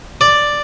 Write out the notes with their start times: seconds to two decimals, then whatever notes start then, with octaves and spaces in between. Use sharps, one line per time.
0.21 D5